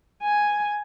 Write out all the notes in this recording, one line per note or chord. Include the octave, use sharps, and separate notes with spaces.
G#5